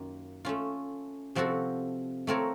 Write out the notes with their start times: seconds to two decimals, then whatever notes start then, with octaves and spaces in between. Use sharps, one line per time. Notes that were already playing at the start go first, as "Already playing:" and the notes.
Already playing: F#2 D#3 A#3 F4
0.45 A3 C#4 F4
1.35 C3 F3 C4 F#4 A4
2.27 A3 C4 F4 A#4 C#5